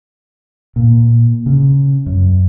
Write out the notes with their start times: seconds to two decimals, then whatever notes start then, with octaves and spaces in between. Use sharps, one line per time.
0.76 A#2
1.46 C#3
2.06 F#2